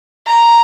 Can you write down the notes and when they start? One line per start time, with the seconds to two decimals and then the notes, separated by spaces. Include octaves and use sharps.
0.27 A#5